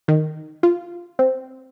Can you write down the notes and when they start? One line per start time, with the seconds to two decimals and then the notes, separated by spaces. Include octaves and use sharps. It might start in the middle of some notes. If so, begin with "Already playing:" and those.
0.08 D#3
0.63 F4
1.19 C4